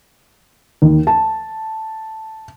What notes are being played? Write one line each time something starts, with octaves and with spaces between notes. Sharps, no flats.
D#2
A5